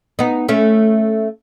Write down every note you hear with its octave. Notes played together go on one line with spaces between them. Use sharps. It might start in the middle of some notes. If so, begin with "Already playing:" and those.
B3 D#4
A3 C#4